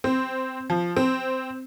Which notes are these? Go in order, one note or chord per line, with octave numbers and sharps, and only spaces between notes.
C4
F3
C4